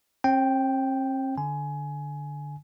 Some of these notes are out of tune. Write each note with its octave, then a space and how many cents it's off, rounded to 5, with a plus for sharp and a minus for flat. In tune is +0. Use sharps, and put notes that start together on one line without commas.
C4 +45 G5 +0
D3 +0 G#5 +15